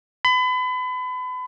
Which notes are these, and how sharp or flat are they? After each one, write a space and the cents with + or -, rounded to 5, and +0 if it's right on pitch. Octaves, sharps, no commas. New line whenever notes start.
B5 +35